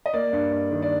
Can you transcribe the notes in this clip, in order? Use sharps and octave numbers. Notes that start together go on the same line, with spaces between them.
D#5
A#3 D5
G2
G2
D#3
D5